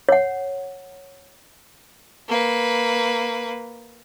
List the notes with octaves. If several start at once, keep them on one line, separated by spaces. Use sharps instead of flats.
C#5 F#5
A#3 B4